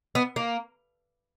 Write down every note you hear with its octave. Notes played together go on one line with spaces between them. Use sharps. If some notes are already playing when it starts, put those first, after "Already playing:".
B3
A#3